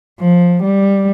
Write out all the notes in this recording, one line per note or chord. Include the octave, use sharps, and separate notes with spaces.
F3
G3